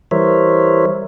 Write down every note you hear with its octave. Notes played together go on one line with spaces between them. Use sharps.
E3 G3 A#4 C5 C#5 E5